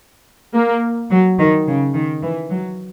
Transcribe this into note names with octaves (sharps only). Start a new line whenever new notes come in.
A#3
F#3
D#3
C#3
D#3
E3
F#3